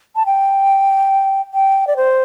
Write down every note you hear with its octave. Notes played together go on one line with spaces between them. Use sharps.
A5
G5
G5
D5
C5